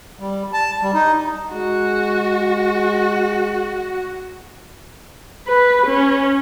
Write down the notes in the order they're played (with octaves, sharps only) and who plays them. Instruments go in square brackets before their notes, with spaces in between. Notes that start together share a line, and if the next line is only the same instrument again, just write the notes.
[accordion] G3
A5
G3
D#4
[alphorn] G#3 [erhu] F#4
[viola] B4
C#4